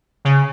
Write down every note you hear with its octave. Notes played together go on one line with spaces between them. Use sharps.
C#3